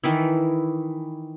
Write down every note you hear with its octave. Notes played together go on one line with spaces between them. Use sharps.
D#3 E3 E4